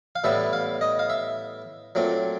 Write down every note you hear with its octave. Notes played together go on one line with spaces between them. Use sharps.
F5
A2 E3 G3 B3 E5
F5
D#5
F5
E5
A#2 F#3 A3 C4